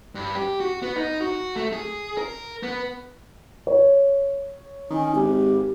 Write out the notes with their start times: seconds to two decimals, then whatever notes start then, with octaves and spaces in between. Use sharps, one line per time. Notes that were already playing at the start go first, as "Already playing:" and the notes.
0.15 G2
0.35 G4
0.60 F#4
0.82 B3
0.96 D#4
1.21 F#4
1.56 A3
1.73 G#4
2.18 A#4
2.63 B3
3.67 C#5
4.90 D#3 C#4
5.15 G#1 G4